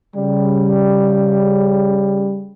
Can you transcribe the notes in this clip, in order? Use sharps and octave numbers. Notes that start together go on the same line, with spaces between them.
C#3 G3